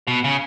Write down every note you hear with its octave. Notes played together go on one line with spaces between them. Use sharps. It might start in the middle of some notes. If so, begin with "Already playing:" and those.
B2
C#3